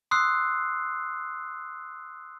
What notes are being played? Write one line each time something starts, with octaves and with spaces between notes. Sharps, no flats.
C6 D#6 E6 F#6 C7